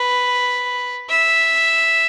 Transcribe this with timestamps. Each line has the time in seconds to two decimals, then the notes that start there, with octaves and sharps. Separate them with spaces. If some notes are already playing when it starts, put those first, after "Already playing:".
Already playing: B4
1.09 E5